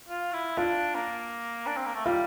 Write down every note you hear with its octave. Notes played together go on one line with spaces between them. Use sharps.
F4
E4
D4 F4
A#3
D4
C4
A#3
A3
G3 F4